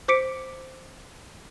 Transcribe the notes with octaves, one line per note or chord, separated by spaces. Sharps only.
C5 D6 B6 C#7 D7